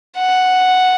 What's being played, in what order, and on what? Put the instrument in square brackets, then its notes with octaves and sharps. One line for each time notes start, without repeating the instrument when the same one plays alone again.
[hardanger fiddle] F#5